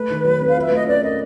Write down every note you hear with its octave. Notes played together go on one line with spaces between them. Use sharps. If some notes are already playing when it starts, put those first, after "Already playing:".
Already playing: A3 B4
D#3
F#3
C4
F5
F4 E5
A3 D#5
C#4 D5
A#4 D#5